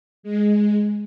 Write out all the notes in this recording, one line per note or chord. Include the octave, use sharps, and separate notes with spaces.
G#3